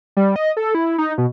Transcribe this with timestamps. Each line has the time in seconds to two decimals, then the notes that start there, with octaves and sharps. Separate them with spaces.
0.17 G3
0.36 D#5
0.57 A4
0.75 E4
0.98 D#4
1.18 B2